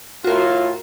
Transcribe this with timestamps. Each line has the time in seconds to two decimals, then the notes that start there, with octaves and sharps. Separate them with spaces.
0.24 A2 F4 F#4 A#4